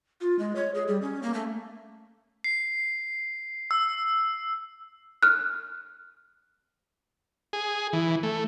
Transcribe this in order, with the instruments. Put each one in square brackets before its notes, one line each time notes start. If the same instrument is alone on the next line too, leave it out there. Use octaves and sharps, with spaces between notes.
[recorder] F4
G#3
C#5
G#4
G3
C#4
A#3
A3
[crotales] C7
E6
[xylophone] F6 F#6
[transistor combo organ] G#4
E3
A3